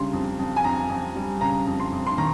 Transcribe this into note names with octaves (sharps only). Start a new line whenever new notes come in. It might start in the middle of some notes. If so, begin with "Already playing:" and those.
Already playing: C#3 G3 C6
F2
F2
G#5
F2 A#5
F2
G3
C#3 A#5
F2
C6
F2
C6
D#3 A#5